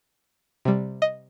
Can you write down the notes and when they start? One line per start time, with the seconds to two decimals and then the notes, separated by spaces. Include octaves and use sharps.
0.65 C3 G3
1.02 D#5